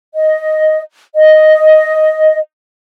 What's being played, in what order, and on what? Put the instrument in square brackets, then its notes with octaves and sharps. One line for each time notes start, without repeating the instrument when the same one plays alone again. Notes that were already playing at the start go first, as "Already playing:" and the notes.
[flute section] D#5
D#5